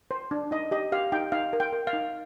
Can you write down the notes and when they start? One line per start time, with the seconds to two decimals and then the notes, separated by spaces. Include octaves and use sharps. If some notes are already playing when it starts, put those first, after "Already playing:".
0.11 C5
0.31 D4
0.51 D#4 D#5
0.71 G4 D#5
0.92 G4 F5
1.12 D#4 G5
1.32 D#4 F5
1.53 A#4
1.60 G5
1.73 A#4
1.87 F5
1.93 D#4